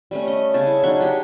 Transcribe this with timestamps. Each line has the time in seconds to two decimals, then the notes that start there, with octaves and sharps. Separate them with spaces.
0.11 G3 A3 C#4
0.28 D#5
0.54 C#3 G#4 A5
0.67 E4
0.83 F#3 D4 D#4 C#6
1.00 G4 G#4